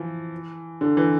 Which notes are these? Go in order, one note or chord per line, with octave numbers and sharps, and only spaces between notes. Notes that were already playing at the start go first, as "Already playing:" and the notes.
Already playing: E3 F3
D3
E3